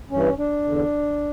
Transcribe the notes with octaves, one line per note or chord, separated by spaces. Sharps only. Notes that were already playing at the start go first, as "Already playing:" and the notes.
G2 E3 C#4
D4
E2 D3